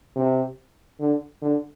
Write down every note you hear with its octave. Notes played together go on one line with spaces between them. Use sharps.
C3
D3
D3